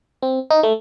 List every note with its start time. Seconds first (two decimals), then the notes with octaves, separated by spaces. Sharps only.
0.22 C4
0.50 D#4
0.63 A3